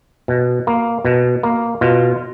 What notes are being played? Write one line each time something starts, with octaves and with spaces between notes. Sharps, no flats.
B2
A#3
B2
A#3
B2 F4